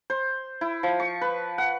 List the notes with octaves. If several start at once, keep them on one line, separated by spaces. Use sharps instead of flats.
C5
E4
F3
C#6
B4
F#5